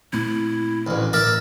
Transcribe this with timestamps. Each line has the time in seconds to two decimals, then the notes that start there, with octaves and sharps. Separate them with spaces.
0.13 A#2 A3 C4 E4
0.87 A1 D2
1.13 A2 E3 A#4 D5 E5